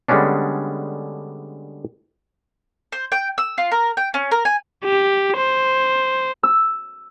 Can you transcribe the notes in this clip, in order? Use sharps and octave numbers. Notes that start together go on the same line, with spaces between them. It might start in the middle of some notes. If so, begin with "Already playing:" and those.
D3 G3 G#3 B3 C#4 D4
C5
G5
E6
F4
A#4
G5
C#4
A#4
G#5
G4
C5
E6